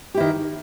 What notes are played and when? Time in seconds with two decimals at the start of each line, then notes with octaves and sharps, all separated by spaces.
0.14 G4
0.17 E4
0.20 D#3